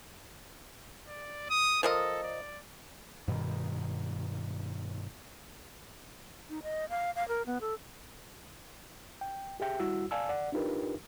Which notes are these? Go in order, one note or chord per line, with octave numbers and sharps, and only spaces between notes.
D5
D#6
F3 A4 A#4 D#5
D5
G2 B2 D#3
D#4
D#5
F5
F5
A#4
B3
A4
G5
G4 G#4 E5 G5
G3 E4 F#4 E6
D5 F5 G#5 A5 E6
D5 F#5
D4 D#4 F4 G4 A#4 B4